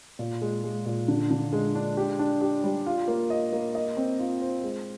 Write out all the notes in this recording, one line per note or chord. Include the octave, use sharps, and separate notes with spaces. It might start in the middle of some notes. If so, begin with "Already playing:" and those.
A#2
G#3
G#3
A#2
D3
D3
G#3
D4
G4
D4
G4
G3
F4
A#3
D#5
A#3
D#5
C4
F4
C5
G#3